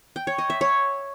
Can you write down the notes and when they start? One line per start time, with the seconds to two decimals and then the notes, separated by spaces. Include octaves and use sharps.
0.16 G5
0.27 C#5
0.38 D#5
0.50 E5
0.61 C#5